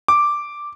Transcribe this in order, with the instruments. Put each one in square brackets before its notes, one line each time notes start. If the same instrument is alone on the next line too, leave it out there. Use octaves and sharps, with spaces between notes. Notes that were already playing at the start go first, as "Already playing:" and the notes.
[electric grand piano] D6